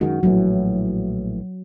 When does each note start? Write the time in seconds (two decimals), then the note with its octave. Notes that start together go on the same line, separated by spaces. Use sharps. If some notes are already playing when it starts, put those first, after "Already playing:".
0.01 F#2 D#3 G#3 F#4
0.23 A#1 A2 E3 F#3